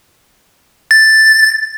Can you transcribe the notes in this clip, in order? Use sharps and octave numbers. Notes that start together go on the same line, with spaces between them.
A6